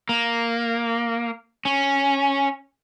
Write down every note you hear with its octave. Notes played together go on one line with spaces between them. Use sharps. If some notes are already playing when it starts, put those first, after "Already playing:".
A#3
C#4